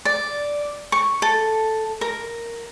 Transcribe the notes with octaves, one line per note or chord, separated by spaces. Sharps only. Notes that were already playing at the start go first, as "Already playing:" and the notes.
D5
C#6
A4
A#4